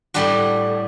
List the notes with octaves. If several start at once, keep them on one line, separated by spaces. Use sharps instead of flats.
A2 G3 D4 F#4